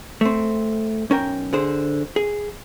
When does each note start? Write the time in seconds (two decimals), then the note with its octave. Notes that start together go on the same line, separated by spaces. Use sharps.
0.21 A3 C4
1.10 B1 C#4 A#4 G5
1.53 D3 G#4 C5
2.16 G#4